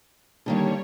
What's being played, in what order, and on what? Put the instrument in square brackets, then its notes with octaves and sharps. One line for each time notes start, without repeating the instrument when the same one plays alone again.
[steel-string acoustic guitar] D3 D#3 A#3 [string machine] G3 C#5